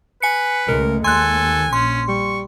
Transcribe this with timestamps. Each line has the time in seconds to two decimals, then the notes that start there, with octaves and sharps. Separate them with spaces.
0.22 B4 G#5 C#7
0.68 C#2 G#3 A3 A#4
1.05 D#2 A4 G#5 C6 F#6
1.73 A#1 C#4 C6
2.08 G3 C#6